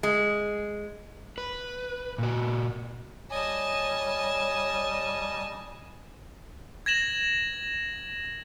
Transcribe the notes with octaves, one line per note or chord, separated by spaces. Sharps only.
G#3
B4
A#2 F#4
G3 C#5 D#5 G#5 A5
G#6 A#6 E7 F#7